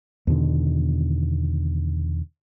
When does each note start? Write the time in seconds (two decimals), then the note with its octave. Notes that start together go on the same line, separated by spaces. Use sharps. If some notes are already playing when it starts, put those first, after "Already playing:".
0.27 E2 B2 D3 D#3